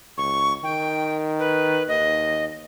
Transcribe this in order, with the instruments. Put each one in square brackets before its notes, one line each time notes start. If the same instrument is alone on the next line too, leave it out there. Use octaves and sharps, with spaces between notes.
[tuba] C#2 [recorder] C#6
[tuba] D#3 [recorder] G5
[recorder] B4
[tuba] D#2 [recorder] D#5